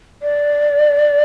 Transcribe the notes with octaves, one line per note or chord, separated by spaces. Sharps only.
D5